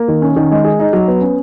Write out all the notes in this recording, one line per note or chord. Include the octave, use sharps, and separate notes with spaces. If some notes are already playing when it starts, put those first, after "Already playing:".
Already playing: A#3
D#3
C#4
D#3
G#3
G#4
D#4
F#3
B3
C#4